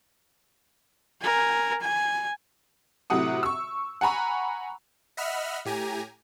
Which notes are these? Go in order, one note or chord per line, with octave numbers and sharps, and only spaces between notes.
A#4 G#5
G#5
A2 C3 F#3 F#4 F#5 D#6
C#6 E6
F#5 G#5 A#5 B5 C#6
D#5 E5 F#5 B5 F6
A2 G4 G#5 A#5